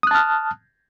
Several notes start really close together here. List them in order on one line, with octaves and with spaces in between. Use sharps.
D#6 F#6 A5 F6